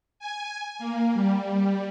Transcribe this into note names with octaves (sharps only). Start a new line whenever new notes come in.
G#5
A#3
G3